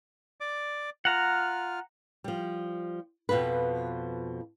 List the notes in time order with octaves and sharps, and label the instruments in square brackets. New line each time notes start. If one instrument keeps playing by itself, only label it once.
[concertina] D5 D6
[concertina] F4 F6 [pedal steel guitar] F#5 A#5
[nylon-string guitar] F3 G3
F2 B2 F3 F4 B4